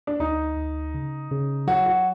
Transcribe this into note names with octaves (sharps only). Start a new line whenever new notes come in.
D4
D2 D#4
D2
C#3
C#3
F#3 F#4
F#4